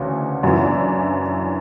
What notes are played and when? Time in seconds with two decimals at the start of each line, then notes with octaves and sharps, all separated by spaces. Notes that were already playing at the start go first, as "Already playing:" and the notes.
Already playing: D2 C#3 E3 F#4
0.43 F#2 C#3 E3 F#4
0.53 E4
0.63 D4